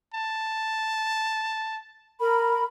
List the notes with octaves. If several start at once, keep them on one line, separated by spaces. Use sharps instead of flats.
A5
A#4 B5